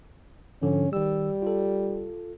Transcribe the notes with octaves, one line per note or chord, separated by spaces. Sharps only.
G#2 D3 F3 C#4
D#3 G3 E6
F4 A4